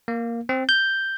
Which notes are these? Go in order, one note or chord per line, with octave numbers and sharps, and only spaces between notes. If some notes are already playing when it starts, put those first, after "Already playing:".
A#3
C4
G6